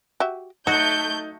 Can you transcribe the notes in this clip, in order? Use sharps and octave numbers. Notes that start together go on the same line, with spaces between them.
F#4 G4 E5
F#3 A3 D#4 F#4 G6